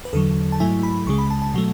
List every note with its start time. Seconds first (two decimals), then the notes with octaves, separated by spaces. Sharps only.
0.05 B4
0.13 E2 D3 F#3 A4
0.52 A5
0.60 G#2 F#3 A3 E4 G#5
0.83 B5
1.07 C#2 C#3 G#3 C#6
1.18 B5
1.30 A5
1.42 A5
1.54 B2 F#3 A3